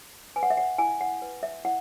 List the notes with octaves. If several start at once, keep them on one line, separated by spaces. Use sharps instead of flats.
B4 G#5
F#5
E5
F#5
E4 G#5
F#5
B4
E5
E4 F#5